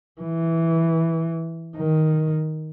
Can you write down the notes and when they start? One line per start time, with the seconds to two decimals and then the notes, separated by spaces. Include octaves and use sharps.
0.21 E3
1.76 D#3